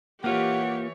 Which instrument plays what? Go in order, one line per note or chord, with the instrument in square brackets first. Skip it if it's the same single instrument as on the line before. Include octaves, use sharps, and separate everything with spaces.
[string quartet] E3 C#5 [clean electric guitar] A#3 F4 [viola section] G4 [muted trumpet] F#5